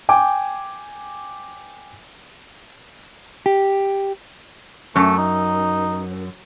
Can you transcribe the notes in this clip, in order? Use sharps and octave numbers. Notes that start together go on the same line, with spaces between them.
G5 G#5 D6
G4
F#2 A3
D#4